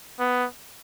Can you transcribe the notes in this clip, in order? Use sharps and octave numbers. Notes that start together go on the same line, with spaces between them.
B3